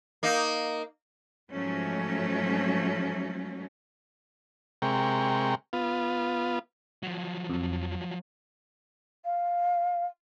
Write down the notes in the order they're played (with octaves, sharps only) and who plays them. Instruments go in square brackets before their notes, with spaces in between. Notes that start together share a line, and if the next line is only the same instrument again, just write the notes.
[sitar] A#3 D#4
[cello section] G#2 F3 F#3 A3 C#4
[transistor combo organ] C3 G#3 A#4 G5 C#6
B3 F4
[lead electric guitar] F3 F#3
[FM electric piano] F2
[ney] F5